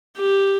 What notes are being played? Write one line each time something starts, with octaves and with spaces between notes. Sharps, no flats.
G4